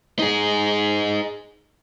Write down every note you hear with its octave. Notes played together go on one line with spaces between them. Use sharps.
D#4 G#4